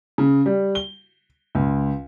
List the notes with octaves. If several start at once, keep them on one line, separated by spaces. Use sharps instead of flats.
C#3
G3
G7
C#2